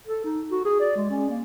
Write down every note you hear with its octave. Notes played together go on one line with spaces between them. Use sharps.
A4
D#4
F#4
G#4
D5
G#3
C#4
A#3